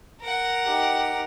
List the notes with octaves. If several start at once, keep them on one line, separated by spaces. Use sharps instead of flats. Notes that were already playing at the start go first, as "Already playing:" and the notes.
A#4 F#5
D#4 G4